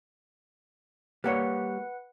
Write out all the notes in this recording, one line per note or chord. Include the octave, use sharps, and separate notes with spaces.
G3 A#3 B4 C#5 F#5